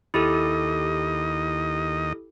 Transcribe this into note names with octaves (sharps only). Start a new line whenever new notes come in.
D#2 E4 G4 A4 D#5